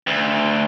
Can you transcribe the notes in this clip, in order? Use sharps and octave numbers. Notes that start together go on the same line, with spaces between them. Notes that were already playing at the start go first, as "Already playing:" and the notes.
D2